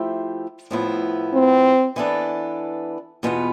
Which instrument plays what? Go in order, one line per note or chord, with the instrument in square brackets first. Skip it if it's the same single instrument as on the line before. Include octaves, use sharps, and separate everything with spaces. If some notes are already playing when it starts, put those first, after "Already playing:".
Already playing: [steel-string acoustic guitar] F3 A3 E4 G4 C5
A2 F3 B3 E4
[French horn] C4
[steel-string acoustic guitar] E3 B3 D4 A4
E2 B2 B3 F4 B4